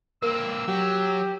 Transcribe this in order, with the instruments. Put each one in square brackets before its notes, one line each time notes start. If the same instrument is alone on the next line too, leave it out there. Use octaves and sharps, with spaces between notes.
[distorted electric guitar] A#3 C4 [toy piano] A#4 [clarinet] E6
[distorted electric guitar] F#3 [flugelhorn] G4